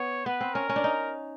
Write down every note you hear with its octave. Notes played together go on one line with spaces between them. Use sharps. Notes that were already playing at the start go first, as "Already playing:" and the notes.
Already playing: B3 C#5
B3 B4
C4
C#4 A#4
C#4
D4
D#4